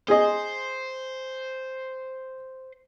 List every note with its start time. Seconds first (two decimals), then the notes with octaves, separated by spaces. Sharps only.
0.08 G#4 C5 D#5